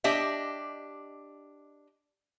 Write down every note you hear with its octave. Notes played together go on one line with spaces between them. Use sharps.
D4 G4 D#5 E5